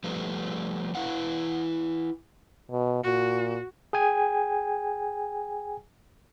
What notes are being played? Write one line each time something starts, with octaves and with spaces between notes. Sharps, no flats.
F3 G3 A3 B4
E4 B4 F5 F#5
B2
A#2 F#4
G#4 G5 G#5